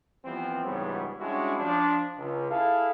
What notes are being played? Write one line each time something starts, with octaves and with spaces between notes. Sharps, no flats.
E3 F3 G3 B3 C4
C#2 G#2 E3 G3 B3 C#5
G3 G#3 C#4 D4 E4 F#4
F3 D4
C#2
E4 G#4 A4 F5